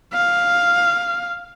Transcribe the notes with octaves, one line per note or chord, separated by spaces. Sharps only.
F5